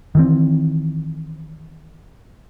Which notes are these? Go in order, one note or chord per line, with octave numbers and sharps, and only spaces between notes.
D#3 E3 C4